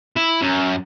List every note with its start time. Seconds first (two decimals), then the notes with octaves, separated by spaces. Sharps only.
0.17 E4
0.42 F#2